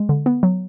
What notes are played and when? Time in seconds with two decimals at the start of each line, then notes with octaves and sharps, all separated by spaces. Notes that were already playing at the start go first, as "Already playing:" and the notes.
Already playing: G#3
0.09 D3
0.26 B3
0.43 F#3